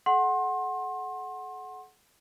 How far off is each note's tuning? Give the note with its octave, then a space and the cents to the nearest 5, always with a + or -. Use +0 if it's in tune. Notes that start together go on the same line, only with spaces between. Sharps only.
A4 -45 F#5 +0 C6 +30